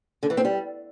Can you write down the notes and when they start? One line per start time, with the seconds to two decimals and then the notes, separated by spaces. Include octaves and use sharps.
0.23 D3
0.30 E3
0.37 C4
0.45 G3